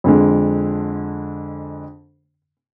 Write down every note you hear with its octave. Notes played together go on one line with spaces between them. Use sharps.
F2 D3 G#3